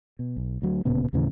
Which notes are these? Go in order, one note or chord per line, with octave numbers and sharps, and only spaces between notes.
B2
B1
D2 F#3
D1 A#2 C#3 B3
D#2 A2 C#3 E3